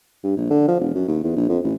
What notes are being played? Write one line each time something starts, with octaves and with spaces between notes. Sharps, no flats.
G2
A#1
D3
F3
E1
F#2
D#2
E2
A#1
F2
A1